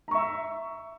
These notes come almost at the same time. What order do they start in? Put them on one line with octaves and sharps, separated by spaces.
A#5 C#6 E5 E6